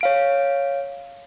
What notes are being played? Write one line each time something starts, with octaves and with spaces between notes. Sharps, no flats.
C#5 F5 D7